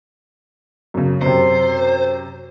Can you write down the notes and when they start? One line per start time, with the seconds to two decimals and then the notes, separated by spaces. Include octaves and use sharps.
0.94 F#2 C#3
1.22 F#2 C3 C5